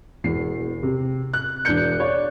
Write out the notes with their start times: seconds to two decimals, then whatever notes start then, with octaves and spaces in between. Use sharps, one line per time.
0.24 E1 E2 C7
0.83 C3
1.33 F#6
1.65 E1 D4 F#6 G6 C#7
2.00 C#5 D5